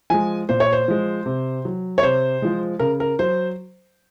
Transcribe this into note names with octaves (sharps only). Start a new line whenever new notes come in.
F3 G#3 G#5
A#2 C5
C#5
C5
F3 G#3
C3
F#3
C#5
C3 C5
F3 G#3
C#3 A#4
A#4
F#3 C5